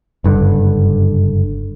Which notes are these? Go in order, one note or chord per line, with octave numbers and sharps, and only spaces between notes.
F#1 G2 D3